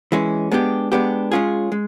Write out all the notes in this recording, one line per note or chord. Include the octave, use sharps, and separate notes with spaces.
E3 G#3 C#4
G#3 B3 D4 G4
G#3 B3 D4 G4
G#3 C#4 F4 G#4
G#3